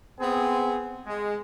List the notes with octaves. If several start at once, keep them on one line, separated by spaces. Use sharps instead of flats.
B3 C4 G#4
G#3